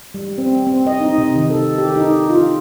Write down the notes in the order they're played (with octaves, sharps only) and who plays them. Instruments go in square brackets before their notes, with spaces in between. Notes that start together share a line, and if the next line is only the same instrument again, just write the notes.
[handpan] G3
C4
C4
D#5
D#4
C3
D#3
A4
G4
D#4
F4